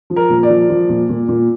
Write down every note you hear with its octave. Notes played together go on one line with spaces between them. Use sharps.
F3
A#4
A#2
D5
F3
F3
A#2
A#2
A#2